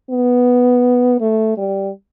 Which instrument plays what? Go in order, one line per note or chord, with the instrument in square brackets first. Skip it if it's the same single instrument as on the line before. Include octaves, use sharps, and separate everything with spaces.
[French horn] B3
A3
G3